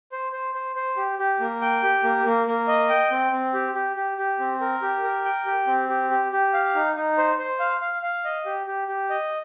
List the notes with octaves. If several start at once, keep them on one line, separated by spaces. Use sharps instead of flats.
C5
C5
C5
C5
G4
G4
A#3
G5
G4
A#3
A#3
A#3
D#5
G5
C4
C4
G4
G4
G4
G4
C4
A#4
G4
A#4
G5
G4
C4
G4
G4
G4
F5
D#4
D#4
C5
C5
F5
F5
F5
D#5
G4
G4
G4
D#5